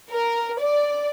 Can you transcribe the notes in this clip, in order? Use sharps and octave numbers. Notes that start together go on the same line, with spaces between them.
A#4
D5